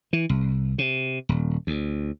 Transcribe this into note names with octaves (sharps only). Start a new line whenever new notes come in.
E3
C2
C3
D#1
D2